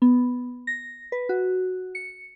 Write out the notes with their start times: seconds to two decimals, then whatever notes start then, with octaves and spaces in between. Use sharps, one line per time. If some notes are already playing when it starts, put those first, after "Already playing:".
0.02 B3
0.67 A#6
1.12 B4
1.29 F#4
1.95 C#7